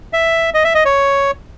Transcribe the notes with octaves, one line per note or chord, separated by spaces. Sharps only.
E5
D#5
E5
D#5
C#5